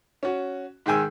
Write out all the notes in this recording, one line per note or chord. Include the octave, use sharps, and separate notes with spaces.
C#4 F#4
G#2 D#3 G#3 G5 G#5 E6